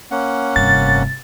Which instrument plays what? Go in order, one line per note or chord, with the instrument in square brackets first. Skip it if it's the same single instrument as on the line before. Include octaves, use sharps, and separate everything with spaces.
[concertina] A#3 C#4 F#5
[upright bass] F1 G2 [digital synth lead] A6